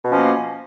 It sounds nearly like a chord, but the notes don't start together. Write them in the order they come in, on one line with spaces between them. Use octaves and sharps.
B2 C#4 F3 A#3